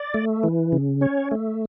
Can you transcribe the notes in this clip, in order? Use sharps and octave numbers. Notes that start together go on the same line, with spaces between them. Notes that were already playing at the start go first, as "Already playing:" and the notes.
Already playing: D5
A3
E3
C#3
C#4 C#5
A3